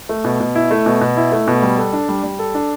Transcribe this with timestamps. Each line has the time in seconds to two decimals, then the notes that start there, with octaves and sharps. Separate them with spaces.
0.09 A3
0.24 B2
0.40 B2
0.55 E4
0.71 A3
0.86 B2
1.01 B2
1.17 E4
1.32 A3
1.48 B2
1.62 G3
1.78 A4
1.93 D4
2.09 G3
2.24 G3
2.39 A4
2.54 D4